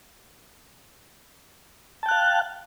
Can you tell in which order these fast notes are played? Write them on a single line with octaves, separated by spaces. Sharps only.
A5 G5 F#6 F5